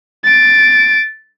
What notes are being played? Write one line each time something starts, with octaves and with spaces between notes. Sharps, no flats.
A6 D7